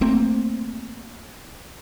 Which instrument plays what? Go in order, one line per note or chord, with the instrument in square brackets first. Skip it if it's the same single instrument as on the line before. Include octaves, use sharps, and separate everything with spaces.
[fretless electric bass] A3 A#3 C4